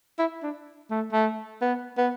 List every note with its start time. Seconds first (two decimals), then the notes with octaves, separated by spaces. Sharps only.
0.19 E4
0.43 D4
0.90 A3
1.12 A3
1.62 B3
1.98 B3